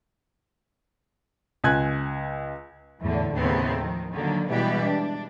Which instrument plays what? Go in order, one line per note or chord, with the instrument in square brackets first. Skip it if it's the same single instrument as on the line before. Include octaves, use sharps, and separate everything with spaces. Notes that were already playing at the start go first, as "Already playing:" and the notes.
[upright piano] C#2 G#5 F#6 G#6
[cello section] E2 A2 D3
D#2 A2 C#3 B3 C4
D#3 F3
D3 D#3 F#3 A#3
B2 E3 G3 G#3 B3 G4
D4